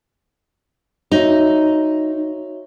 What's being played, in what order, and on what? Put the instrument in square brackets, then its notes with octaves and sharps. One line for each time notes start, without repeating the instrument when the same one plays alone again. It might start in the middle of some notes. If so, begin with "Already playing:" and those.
[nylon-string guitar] D#4 [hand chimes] F#4 C#5 E5